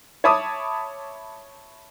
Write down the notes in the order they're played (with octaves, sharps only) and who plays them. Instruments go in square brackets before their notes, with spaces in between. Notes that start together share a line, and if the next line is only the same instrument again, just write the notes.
[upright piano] C#5 E5 A5 B5 D6 D#6